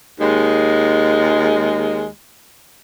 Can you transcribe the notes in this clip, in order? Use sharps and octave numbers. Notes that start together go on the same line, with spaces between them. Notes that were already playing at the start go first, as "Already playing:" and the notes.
D#2 G#3